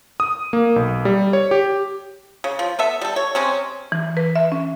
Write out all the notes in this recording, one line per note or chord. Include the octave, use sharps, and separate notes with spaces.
D#6
A#3
B1
G3
C#5
G4
C#3
F3
B3 A4 E5
G3 A4
C#5
C3 G#3 C4 C#4
E3
B4
E5
C#4